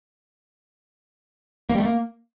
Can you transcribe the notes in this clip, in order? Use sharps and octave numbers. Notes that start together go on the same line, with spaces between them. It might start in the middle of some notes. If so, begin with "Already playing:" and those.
A#3
G3
A3
A#3